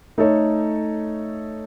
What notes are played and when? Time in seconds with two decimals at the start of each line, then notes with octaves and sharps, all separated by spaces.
0.18 A3 D#4 A4 C#5